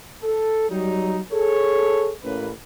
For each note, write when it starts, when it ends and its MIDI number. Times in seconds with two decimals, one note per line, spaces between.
0.23 0.69 69
0.70 1.19 54
0.70 1.19 55
0.70 1.19 63
1.32 2.11 68
1.32 2.11 69
1.32 2.11 73
2.24 2.49 33
2.24 2.49 58
2.24 2.49 61
2.24 2.49 71